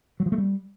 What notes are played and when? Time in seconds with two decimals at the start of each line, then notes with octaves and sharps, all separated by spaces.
0.20 F#3
0.26 F3
0.32 A3
0.38 G3